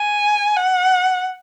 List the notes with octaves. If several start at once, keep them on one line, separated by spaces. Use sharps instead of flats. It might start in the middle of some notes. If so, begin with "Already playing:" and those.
Already playing: G#5
F#5